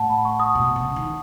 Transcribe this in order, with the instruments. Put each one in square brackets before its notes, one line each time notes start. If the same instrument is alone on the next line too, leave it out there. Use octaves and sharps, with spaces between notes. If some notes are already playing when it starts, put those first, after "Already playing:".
Already playing: [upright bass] A2 [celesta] F#5 A5
[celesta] B5
C#6
D#6
[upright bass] B2
C#3
D#3